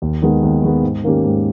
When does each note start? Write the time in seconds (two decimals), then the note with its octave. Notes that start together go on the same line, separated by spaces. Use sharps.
0.02 D#2
0.22 D#3 G#3 B3
0.42 D#2
0.63 D#3 G#3 B3
0.83 G#2
1.04 D#3 A#3 C#4 G4
1.24 G#2